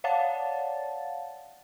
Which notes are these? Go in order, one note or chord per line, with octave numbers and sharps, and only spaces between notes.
C#5 D5 F5 F#5 A5 A6